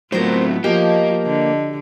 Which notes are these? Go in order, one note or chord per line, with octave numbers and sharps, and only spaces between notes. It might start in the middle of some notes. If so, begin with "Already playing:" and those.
A2 F#3 A3 B3 C4 F4 A#4 C5
F3 A#3 G4 D#5 A5
D3